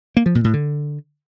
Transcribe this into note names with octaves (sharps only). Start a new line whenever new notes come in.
A#3
F3
A#2
A2
D3